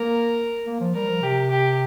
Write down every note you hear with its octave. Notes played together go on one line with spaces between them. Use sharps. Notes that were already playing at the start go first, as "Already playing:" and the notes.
Already playing: A#3 A#4
A#3
F3
G3 A#4
F3
C3 G4
G4